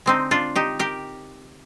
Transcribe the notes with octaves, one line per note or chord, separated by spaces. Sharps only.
D3 G#3 C4 D#4
D4 F4
D#4 G4
G4 A#4